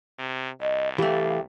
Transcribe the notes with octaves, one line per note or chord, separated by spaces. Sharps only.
C3
C2 D#5
E3 A3 G4 F5